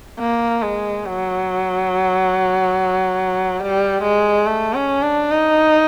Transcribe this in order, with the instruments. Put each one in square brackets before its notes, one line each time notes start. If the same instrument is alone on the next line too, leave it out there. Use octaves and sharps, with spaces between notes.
[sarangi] A#3
G#3
F#3
G3
G#3
A3
C#4
D4
D#4